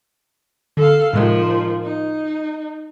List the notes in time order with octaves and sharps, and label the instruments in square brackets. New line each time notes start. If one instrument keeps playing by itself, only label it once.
[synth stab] D3 [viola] A4 F5
[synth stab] A2 C3 G#3 [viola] D#3 F3
[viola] D#4